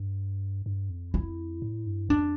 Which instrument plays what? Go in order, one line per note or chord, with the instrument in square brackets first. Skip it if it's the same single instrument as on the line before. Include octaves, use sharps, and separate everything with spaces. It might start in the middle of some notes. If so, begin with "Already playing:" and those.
Already playing: [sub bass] G2
G2
F2
[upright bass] E4
[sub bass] A2
G2
[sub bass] F2 [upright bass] D4